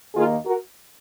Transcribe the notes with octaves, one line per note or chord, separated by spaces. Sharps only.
D#2 D#3 A#3 F4 G#4
F#4 A#4